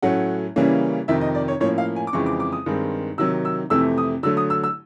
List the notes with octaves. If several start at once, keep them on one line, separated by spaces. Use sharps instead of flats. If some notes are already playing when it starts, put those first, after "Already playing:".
A2 F#3 A3 C#4 F#5
C#3 E3 G3 A#3 C#4
F2 C3 D#3 E5
D#5
D5
C#5
A2 F3 A#3 C#4 C#5
F5
G#5
D6
F2 C#3 E3 G#3 C4 C#6
D6
D6
D#6
G2 D#3 G#3 C4
C3 D#3 F#3 E6
E6
F2 C3 E3 A3 E6
D#6
D3 F#3 A3 E6
D#6
E6
E6